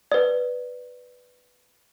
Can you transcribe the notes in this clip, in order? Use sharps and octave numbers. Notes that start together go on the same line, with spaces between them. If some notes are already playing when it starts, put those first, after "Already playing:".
B4 D5